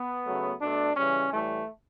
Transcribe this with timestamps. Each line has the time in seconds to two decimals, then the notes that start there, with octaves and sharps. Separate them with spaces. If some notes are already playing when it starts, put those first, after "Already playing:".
Already playing: B3
0.25 C#3 F#3 A3
0.61 B2 A3 D4
0.97 C#3 E3 G3 C#4
1.33 A2 E3 G3 A3